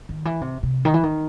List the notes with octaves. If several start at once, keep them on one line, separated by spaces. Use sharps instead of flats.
D#3
E3
C3
C3
D#3
E3
D#3